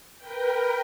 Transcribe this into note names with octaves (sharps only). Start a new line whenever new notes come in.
A#4 B4 G5